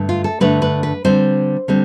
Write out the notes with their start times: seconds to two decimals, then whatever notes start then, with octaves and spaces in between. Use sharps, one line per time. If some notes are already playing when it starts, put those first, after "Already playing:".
Already playing: G2 D3 A3
0.09 F4
0.24 A4
0.40 G2 D3 A3 B4
0.62 B4
0.83 B4
1.04 D3 G3 C4 C5
1.68 D3 G3 C4